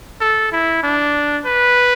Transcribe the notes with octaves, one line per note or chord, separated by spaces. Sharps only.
A4
E4
D4
B4